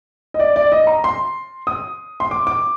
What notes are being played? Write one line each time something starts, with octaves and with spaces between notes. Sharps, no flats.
D#5
D5
D5
D#5
A#5
C6
D#6
C6
D6
D6